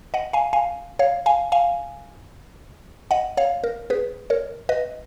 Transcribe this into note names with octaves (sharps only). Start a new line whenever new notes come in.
D#5 F#5
F5 G#5
F5 G#5
C#5 F5
F5 G#5
F5 G#5
D#5 F#5
C#5 F5
A#4
G#4 B4
A#4 C#5
B4 D#5